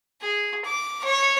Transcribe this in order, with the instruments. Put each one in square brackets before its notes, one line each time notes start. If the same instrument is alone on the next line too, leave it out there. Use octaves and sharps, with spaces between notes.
[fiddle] G#4
D6
C#5